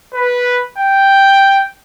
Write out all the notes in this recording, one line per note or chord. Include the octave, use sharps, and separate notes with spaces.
B4
G5